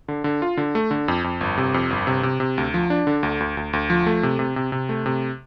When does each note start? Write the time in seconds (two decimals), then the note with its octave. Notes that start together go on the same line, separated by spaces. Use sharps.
0.08 D3
0.24 D3
0.42 F4
0.57 D3
0.75 A3
0.91 D3
1.08 F2
1.24 F2
1.41 G1
1.58 C3
1.74 F2
1.90 G1
2.07 C3
2.23 C3
2.40 C3
2.58 D2
2.74 F3
2.90 D4
3.07 D3
3.23 D2
3.40 D2
3.57 D2
3.73 D2
3.90 F3
4.06 A3
4.23 C3
4.39 C3
4.56 C3
4.72 C3
4.89 A3
5.06 C3